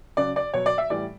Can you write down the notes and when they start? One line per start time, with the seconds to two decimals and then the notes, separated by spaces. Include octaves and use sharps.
0.17 C#3 F#3 D5
0.36 D5
0.54 B2 F#3 C#5
0.66 D5
0.78 E5
0.90 A2 E3 G3 D5